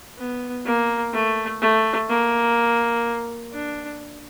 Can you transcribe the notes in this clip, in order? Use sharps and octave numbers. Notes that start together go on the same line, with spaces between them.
B3
A#3
A3
A3
A#3
D4